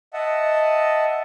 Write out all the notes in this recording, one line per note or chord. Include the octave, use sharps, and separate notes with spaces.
D#5 E5 F#5 A5